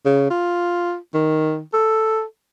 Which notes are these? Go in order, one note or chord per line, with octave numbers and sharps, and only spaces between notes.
C#3
F4
D#3
A4